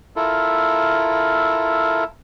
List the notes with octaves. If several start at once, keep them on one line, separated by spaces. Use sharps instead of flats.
E4 F4 A4 A#4